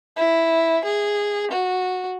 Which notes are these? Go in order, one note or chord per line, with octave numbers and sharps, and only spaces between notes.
E4
G#4
F#4